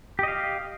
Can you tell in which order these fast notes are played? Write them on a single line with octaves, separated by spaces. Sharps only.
G4 D#5 F5